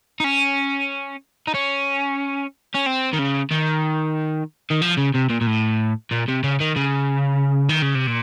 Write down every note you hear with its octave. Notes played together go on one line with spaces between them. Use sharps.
D#4
C#4
D#4
C#4
C#4
C4
D#3
C#3
D#3
D#3
F3
C#3
C3
A#2
A#2
A2
A#2
C3
C#3
D#3
C#3
D#3
C#3
C3
A#2